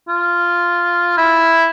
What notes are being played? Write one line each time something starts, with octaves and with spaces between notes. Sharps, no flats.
F4
E4